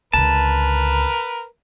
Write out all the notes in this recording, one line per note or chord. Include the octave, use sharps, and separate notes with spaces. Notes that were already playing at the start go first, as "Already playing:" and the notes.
C#2 D3 A#4 B4 A5